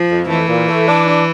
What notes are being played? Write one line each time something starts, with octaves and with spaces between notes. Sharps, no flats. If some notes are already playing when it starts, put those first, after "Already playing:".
Already playing: F3
F2
E3 A3
A#2
A3
D4
D4